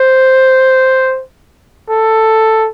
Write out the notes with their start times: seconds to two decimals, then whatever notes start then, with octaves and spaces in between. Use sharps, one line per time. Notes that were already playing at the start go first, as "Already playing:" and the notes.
Already playing: C5
1.89 A4